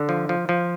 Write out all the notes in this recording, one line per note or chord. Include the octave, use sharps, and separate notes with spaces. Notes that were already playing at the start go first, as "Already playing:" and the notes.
Already playing: D3
F3
F3
F3